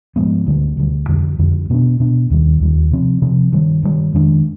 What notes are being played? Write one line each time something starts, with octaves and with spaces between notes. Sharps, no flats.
G#2 F3 G#3 B3
D2 D3 G3
D2 D3 G3
F2 D3 G3
F2 D3 G3
B2 B3 D4
B2 B3 D4
D#2 D#3 G3
D#2 D#3 G3
C3 F3 C4
C3 F3 C4
G2 D#3 G3
G2 D#3 G3
F2 D#3 G#3 D4